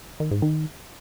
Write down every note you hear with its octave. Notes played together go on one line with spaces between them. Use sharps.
D#3
G#2
D#3